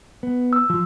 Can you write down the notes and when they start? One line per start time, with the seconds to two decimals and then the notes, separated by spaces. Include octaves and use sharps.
0.23 B3
0.53 E6
0.70 F3